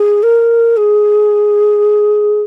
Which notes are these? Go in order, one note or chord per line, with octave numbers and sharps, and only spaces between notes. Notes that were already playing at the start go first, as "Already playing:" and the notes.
Already playing: G#4
A#4
G#4